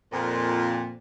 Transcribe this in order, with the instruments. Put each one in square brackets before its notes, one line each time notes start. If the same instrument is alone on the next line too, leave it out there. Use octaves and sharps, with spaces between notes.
[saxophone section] F2 A#2